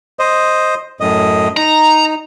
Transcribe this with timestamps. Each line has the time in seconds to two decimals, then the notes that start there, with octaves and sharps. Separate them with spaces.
0.19 C5 D#5
1.00 F#2 A2 D#5
1.57 D#4 A#5